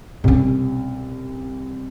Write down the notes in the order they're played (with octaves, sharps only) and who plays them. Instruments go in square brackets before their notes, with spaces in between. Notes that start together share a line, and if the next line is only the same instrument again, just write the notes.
[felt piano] C2 [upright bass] B2 C#4